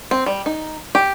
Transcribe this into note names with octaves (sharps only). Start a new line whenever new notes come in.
C4
G3
D#4
G4